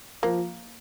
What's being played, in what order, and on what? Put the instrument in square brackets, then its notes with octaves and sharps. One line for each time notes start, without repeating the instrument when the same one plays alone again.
[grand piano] F3 [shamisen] A#3